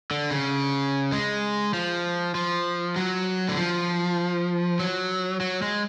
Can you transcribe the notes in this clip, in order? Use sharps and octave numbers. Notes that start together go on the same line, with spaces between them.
D3
C#3
G#3
F3
F3
F#3
D3
F3
F#3
F#3
G#3